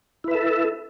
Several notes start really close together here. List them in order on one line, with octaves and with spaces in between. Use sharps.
E4 B4 E5 A4